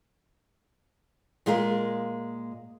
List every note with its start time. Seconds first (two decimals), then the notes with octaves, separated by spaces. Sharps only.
1.46 A#2 G#3 F4 G#4 A#4